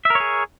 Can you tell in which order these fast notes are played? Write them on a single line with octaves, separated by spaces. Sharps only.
E5 A#4 C#5 G#4